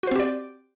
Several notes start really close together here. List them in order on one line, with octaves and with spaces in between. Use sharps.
F#4 C5 C4 G4 D5